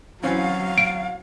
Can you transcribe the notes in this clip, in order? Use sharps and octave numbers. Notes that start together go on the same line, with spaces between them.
E3 F#3 C4 C#4 F5
D7